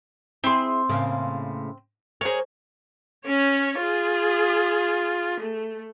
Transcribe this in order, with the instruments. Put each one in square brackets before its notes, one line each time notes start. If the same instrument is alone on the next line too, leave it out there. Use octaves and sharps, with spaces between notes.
[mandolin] C4 C6 [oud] E4 G#4
[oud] A2 C#3 A#3
[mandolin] G#4 C#5 [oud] A#4 C5
[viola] C#4 C#5
F4 G#4
A3